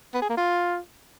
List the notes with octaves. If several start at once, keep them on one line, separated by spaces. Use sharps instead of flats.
B3
G#4
A#3
F4